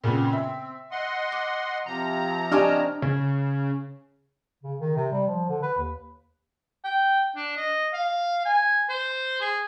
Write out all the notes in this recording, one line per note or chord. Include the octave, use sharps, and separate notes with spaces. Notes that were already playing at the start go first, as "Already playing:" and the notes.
A#2 C#3 B3 C4
E5
D#5 F#5 C6
D6
C3 F3 A#5
D4 G4 D#5 G#5 C#6 F6
C#3
C#3
D#3
C3
G3
F3
D3
B4
D#2
G5
D4
D#5
F5
G#5
C5
G#4